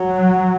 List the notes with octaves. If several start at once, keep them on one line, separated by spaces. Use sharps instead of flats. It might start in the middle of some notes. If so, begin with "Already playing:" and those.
Already playing: F#3